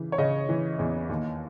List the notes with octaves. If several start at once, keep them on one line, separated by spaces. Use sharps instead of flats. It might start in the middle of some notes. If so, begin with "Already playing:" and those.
Already playing: C#3 E3
C#5
C#3 D#5
E3
E2
D#2